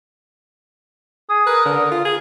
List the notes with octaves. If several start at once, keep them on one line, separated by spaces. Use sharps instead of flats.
G#4 D#6
A#4 B4
D3
F4
G#4